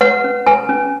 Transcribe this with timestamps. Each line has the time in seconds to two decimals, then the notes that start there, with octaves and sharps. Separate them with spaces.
0.01 B4 F#5
0.24 C#4
0.47 B4 G#5
0.69 C#4